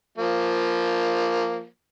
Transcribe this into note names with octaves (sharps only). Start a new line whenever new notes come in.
F3 A#3